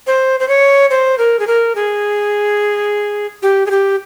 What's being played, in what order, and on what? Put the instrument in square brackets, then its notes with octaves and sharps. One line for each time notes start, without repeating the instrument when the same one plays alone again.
[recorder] C5
C5
C#5
C5
A#4
G#4
A#4
G#4
G4
G#4
G4